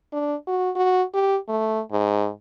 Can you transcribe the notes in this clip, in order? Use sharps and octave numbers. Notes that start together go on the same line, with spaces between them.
D4
F#4
F#4
G4
A3
G#2